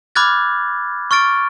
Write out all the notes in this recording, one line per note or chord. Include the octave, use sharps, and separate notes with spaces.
B5 D6 F6 F#6 G#6 A6
C#6 F6 A6 D7